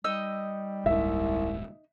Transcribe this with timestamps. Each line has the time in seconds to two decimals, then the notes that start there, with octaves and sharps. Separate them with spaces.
0.04 G3 D#4 D#5 E6
0.86 D#1 C2 G#2 E5